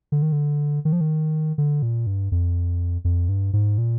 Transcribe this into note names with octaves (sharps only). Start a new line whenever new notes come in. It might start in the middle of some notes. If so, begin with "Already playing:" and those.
D3
D#3
D3
D#3
F3
D#3
D3
A#2
G2
F2
F2
G2
G#2
A#2